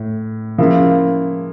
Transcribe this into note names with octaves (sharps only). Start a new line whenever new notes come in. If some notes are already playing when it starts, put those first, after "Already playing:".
Already playing: A2
C#3 F3 A#3 E4